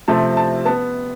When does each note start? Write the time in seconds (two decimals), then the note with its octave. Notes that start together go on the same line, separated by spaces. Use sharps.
0.08 C3 F3 A3 C4 A5
0.37 A5
0.65 B3 A5